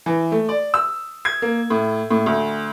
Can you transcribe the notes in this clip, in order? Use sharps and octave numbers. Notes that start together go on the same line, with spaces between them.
E3
A3
D5
E6
G#6
A#3
A2
A2
D2